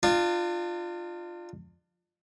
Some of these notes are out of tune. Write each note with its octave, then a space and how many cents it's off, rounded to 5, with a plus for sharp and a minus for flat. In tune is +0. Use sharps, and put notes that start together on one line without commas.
D4 +40 F4 +0